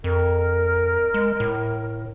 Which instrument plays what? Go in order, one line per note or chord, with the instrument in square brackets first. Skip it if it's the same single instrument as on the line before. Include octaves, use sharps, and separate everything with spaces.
[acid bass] F2 [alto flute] A#4
[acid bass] G#3
A2